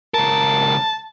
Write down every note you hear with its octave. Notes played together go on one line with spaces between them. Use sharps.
C#2 A#4 A5